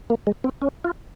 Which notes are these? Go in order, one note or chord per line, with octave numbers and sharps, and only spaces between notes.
A#3
G#3
C4
C#4
F4